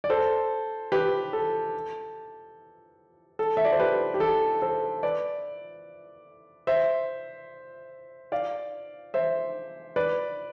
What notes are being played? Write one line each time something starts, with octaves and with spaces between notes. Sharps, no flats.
D5
A4 C5
G4 B4
A4
A4
E5
D5
C5
G4 B4
G4
A4
A4 C5
B4 D5
C5 E5
D5 F5
C5 E5
B4 D5